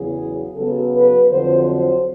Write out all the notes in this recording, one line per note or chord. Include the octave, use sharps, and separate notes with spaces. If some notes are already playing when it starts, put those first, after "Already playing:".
Already playing: E2 C#3 F#3 G#4
C#3 F#3 B3 A4
B4
F2 D3 F#3 C5
C5